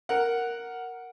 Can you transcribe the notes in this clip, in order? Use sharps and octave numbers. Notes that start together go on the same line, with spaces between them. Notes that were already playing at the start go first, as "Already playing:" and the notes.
A#4 F#5